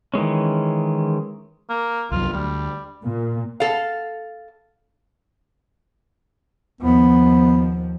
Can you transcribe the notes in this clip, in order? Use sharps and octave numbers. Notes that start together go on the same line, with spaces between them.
D#3 E3 G#3 C#4
A#3
C2 F#2 F#3 F4
D2 G3
A#2
A4 F5
D#2 F3 B3